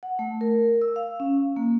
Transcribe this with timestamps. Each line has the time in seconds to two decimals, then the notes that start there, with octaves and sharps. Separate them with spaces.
0.03 F#5
0.19 A3
0.41 A#4
0.82 E6
0.96 F5
1.20 C#4
1.56 A#3